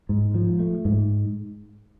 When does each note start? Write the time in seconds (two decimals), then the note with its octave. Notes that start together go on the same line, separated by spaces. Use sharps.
0.09 G#2
0.35 F3
0.60 A3
0.85 G#2